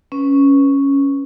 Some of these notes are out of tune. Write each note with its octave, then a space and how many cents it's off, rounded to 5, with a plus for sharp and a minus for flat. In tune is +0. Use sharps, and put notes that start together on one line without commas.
C#4 +0 B4 +0